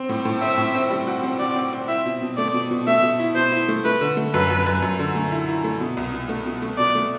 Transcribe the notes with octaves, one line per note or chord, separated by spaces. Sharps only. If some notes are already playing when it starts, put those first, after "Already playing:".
Already playing: C4
A2
A2
C4 E5
A2
C4
G3
F#4
C4
F#4 D5
C4
C4
E4 E5
B2
B2
A3 D5
B2
B2
A3 E5
B2
E4
B2 C5
E4
A3
A3 B4
D3
A3
F#2 B4
F#2
F#2
F#2
D3
A3
E4
E4
A3
B2
C2
B2
A3
B2
A3
B2 D5
A3